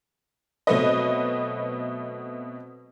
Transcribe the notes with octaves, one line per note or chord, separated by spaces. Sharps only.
B2 F#3 A3 C4 B4 D#5